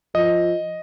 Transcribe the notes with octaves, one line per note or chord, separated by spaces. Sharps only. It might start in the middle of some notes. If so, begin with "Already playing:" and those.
F3 D#5